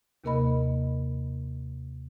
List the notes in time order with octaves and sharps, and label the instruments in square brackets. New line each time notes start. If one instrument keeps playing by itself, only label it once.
[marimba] D#2 C3 A#3 A#4 D#5 B5